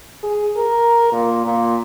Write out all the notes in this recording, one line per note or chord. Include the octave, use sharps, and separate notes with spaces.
G#4
A#4
A#2
A#2